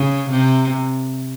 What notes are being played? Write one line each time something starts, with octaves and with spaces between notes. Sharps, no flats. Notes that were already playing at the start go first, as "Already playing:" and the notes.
Already playing: C#3
C3